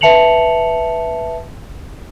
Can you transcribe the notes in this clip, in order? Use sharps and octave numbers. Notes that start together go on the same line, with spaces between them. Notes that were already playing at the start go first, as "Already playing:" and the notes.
B4 E5 A5 C#7 F7 F#7